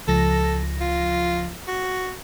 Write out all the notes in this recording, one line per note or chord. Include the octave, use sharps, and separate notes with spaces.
C#2 F3 A4 A#6
F4
F#4